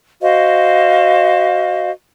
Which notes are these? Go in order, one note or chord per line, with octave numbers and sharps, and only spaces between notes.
F#4 C5 D#5 F5